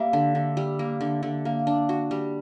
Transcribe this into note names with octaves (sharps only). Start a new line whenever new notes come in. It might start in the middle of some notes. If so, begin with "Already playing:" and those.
Already playing: G3 A#3 E5
D3
D3
G3
A#3
D3
D3
A#3
D4
F#4
G3